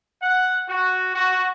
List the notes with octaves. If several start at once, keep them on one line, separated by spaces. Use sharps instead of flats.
F#5
F#4
F#4